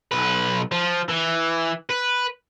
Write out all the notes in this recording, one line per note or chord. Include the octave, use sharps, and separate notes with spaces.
B1 B4
F3
E3
B4